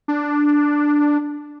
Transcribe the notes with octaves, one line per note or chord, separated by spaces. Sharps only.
D4